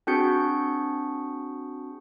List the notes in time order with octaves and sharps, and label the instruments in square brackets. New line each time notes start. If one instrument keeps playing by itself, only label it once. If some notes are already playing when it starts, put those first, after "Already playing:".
[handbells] C4 D4 F#4 G#4 G6 C#7